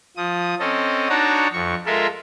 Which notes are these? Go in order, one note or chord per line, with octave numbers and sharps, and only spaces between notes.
F3 D#6
C4 C#4 A4 D#5
D4 D#4 F#4 C#5 A5 A#5
F2 C#6
G#3 F4 A4 A#4 E5